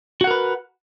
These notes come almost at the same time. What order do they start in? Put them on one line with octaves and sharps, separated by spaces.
F#4 F#5 A#4 B4